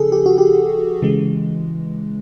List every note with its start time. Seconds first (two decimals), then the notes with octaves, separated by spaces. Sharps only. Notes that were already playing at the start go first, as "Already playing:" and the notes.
Already playing: C#3 F3 G#4 A4
0.12 G4
0.26 F#4
0.38 G4
1.02 C#3 E3 G#3